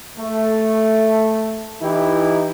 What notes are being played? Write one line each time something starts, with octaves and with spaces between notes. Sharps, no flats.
A3
E3 D#4 E4 G4